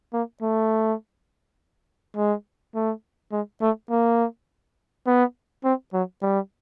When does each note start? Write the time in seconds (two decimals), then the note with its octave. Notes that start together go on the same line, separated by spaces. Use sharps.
0.14 A#3
0.42 A3
2.17 G#3
2.75 A3
3.32 G#3
3.62 A3
3.91 A#3
5.07 B3
5.64 C4
5.94 F#3
6.22 G3